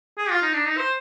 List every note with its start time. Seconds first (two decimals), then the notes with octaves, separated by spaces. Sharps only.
0.17 G#4
0.30 F4
0.42 D#4
0.54 D4
0.66 D#4
0.77 C5